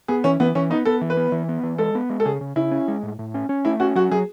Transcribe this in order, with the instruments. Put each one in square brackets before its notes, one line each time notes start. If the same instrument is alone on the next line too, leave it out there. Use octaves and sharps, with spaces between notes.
[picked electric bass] B3 [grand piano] G#4
[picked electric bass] E3 [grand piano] C#4
[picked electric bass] E3 [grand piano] B3
[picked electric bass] E3 [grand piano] C#4
[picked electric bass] B3 [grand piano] D#4
[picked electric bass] B3 [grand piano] A4
[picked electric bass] E3
[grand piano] B4
[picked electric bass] B3
E3
B3
E3
[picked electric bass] G#3 [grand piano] A4
[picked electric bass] B3
G#3
[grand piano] A4
[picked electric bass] C#3 [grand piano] G#4
[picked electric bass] C#3
[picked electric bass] C#3 [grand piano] E4
[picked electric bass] C#4
G#3
A2
A2
C#4
C#4
[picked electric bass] A3 [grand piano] E4
[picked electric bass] C#4 [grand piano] F#4
[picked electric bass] F#3 [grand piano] F#4
[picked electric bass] F#3 [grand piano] G#4